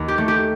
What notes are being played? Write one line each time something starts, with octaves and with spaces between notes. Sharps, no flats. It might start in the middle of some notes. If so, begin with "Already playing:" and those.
Already playing: D#2
G4
A3
G4